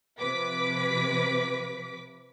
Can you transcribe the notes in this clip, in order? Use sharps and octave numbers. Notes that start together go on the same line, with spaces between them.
C3 F3 B4 D6 B6